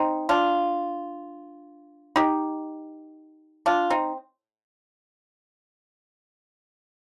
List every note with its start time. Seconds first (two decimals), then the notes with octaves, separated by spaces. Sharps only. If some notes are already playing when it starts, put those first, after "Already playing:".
Already playing: C4 D#4
0.29 D4 F4
2.16 D#4 G4
3.66 D4 F4
3.90 C4 D#4